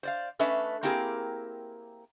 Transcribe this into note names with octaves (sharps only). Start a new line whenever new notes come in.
C5 D5 F5
A3 C#4 D4 B4 D#5 E5
A#3 C4 E4 G4 G#4 A#4